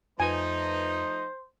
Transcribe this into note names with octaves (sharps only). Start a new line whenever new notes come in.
F2 F3 A3 D#4 F4 B4 C5 G#5